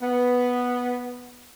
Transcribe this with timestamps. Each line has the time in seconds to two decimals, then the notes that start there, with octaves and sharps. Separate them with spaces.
0.01 B3